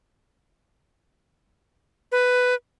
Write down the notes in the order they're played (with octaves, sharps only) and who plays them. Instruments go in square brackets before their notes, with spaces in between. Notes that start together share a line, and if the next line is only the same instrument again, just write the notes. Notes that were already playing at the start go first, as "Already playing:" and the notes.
[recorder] B4